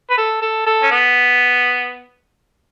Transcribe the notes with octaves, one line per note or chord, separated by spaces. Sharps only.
B4
A4
A4
A4
C#4
B3